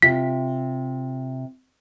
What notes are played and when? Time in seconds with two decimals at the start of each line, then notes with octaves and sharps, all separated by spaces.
0.02 C3 F4 B6